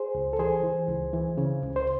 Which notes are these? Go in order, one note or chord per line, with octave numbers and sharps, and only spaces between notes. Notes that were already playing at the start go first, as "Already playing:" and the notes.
Already playing: G#4 C5
C#2
A4
E3 G#4 C5
E3
C#2
E3
C#3
C#2
C5